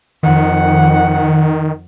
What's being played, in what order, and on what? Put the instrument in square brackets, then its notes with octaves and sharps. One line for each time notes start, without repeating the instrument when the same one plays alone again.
[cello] F2 F#5 [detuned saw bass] D#3